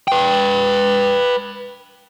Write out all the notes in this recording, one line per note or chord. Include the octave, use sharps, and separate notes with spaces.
B4 G5